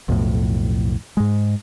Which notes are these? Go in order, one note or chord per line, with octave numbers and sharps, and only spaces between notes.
B1 F2 A2
G#2 G#3